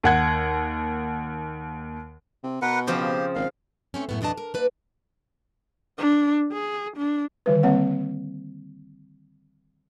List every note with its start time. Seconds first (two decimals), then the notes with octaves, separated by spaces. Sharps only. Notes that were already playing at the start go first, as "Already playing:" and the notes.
0.03 D#2 F#5 G#6
2.44 C3
2.62 B2 A#4 B4 F#5
2.87 C#3 F3 C4 G4 C5
3.35 G#1 F5
3.94 A3 C4 C#4
4.09 F#2 A2 B3
4.21 F2 B2 D4 D#5 A5
4.37 A#4
4.54 A#3 B4 D5
5.98 D4
6.53 G#4
6.97 D4
7.46 D3 D#3 G3 B4
7.63 G3 A#3 C4 C#5 F#5